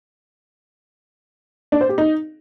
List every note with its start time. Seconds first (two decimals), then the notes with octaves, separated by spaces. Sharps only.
1.72 D4
1.81 C5
1.89 G4
1.98 D#4